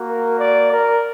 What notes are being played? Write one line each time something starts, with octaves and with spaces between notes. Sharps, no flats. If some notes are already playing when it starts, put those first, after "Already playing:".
Already playing: A#3 F#4
A#4
D5
A#4